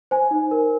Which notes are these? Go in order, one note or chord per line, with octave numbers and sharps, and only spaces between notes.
C5 G#5
D#4
A#4